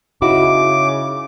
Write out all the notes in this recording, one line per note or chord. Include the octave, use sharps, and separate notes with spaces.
C#3 D#4 E4 F#4 D6